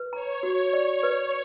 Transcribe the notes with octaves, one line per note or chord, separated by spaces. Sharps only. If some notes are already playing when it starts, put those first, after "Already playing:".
Already playing: B4
C#5 A#5
F#4
D5
B4